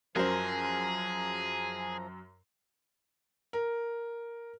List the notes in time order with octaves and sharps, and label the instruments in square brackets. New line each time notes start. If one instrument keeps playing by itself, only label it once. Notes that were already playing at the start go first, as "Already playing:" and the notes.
[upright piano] F#2 F#4 [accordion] F3 A#5 [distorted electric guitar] G#4 [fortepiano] A#4 C5
[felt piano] A#4